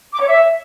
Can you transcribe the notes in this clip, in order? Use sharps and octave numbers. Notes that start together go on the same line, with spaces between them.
D6
C#5
E5